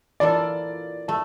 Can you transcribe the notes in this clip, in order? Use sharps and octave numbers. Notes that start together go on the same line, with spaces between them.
E3 A#3 D4 F4 A4 D5
A3 A5